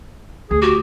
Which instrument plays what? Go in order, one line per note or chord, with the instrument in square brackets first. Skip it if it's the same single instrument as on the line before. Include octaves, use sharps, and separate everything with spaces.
[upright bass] D2 [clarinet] G#4
[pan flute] F#4 [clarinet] G4